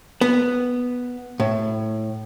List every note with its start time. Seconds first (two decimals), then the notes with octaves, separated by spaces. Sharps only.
0.21 B3
1.40 A2